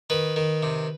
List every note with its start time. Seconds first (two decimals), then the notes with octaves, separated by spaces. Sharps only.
0.10 D#3 B4
0.36 D#3
0.63 C3